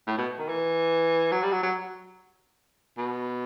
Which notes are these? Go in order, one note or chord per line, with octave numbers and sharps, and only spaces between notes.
A2
B2
D#3
E3
F#3
G3
F#3
F#3
B2